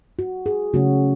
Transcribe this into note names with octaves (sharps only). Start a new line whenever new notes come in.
F#4
G#4
C#3 F#3 A3 C#4 F#4